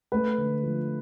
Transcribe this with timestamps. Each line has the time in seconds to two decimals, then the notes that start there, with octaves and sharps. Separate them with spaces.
0.12 A3 B4
0.38 D3
0.63 F3